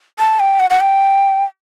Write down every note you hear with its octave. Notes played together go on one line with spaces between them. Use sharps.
A5
G5
F#5
F#5
G5